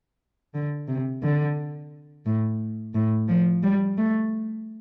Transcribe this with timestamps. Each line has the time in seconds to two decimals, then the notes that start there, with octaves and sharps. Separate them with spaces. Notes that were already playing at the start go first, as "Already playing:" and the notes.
0.54 D3
0.88 C3
1.23 D3
2.26 A2
2.94 A2
3.28 F3
3.63 G3
3.98 A3